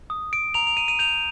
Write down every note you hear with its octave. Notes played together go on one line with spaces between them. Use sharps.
D#6
D7
A#5 F7
F7
D#7
D#7
G6 F7